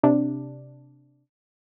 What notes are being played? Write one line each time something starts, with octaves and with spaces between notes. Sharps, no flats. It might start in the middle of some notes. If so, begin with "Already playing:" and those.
C3 D4